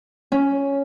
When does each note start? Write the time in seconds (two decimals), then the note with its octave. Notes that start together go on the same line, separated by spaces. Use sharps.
0.32 C#4